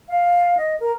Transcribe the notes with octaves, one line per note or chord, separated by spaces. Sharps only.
F5
D#5
A#4